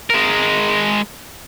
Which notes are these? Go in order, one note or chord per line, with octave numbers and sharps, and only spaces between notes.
G#3 A#4